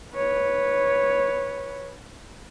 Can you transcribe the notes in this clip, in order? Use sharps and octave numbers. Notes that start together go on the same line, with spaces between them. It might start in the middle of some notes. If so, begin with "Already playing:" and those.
B4 C#5